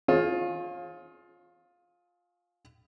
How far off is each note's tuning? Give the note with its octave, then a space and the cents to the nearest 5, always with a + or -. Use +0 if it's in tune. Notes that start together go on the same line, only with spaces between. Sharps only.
F4 +15 G#4 +30 C#5 -40